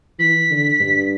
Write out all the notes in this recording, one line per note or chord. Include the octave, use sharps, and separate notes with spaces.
E3 B6
D3
G2